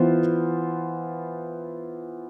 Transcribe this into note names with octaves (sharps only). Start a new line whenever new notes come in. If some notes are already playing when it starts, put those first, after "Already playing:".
Already playing: E3 B3 F4 C5